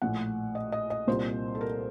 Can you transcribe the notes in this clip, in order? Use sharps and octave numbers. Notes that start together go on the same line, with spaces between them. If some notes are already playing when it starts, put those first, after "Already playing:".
A#1 A2 F#5
D#5
D#5
D#5
C2 A#2 C5
A4
A#4